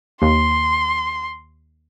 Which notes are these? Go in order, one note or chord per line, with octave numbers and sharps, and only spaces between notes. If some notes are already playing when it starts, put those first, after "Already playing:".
D#2 C6